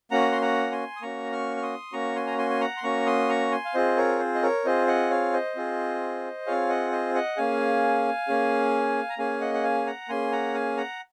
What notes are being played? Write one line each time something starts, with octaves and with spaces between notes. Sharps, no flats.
A#3 C#4 F#4 F#5 A#5
C6
F#5 A#5
G#5 C6
D#6
A#3 C#4 F#4 A#5 C#6
C#6 F6
F6
C6 D#6
A#3 C#4 F#4 A#5 C#6
G#5 C6
A#5
G#5 C6
G#5
F#5 A#5
C6
A#3 C#4 F#4 A#5 C#6
C6 D#6
A#5 C#6
G#5 C6
F5
C4 F4 G#4 C5 D#5
A#4 C#5
C5
D#5
A#4 C#5
C4 F4 G#4 C5 D#5
D#5 F#5
C#5 F5
C5 D#5
C4 F4 G#4
C4 F4 G#4 C#5 F5
D#5 F#5
C5 D#5
D#5 F#5
A#3 C#4 G#4 F5 G#5
A#3 C#4 G#4
A#5
A#3 C#4 G#4 F5 G#5
D#5 F#5
F#5
F5 G#5
F#5 A#5
A#3 C#4 G#4 G#5 C6
F#5 A#5
F5 G#5
F#5 A#5